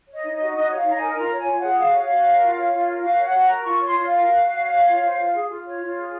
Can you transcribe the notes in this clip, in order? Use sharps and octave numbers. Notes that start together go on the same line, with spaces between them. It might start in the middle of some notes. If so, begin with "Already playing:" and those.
C#5 D#5
D#4
D#5
F#4
D#4 D#5
C#5
F5
D#4 A#5
A#4 G#5
F4 A#5
C#5
G#5
F4
F#5
G#4
F#4 F5
C#5
F#4
A#4
F4
C#5
F4
A#4
F#4 F5
C#5
F#5
F#4
A#4 A#5
F4 C#6
C#5
C6
F4
F5
A#4
F#4
F#4
C#5
C#5
F4
C5
F4
G#4
F4
C#5
F4
G#4